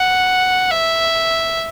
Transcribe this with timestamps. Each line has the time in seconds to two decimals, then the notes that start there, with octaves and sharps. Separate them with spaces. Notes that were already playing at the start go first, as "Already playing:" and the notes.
Already playing: F#5
0.71 E5